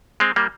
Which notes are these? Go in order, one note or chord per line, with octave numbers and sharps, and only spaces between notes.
G#3 C4
G3 A#3